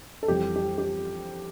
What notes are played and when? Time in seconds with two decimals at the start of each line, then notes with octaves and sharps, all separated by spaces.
0.23 A4
0.28 F2 E3 G3 G4
0.56 G4
0.78 G4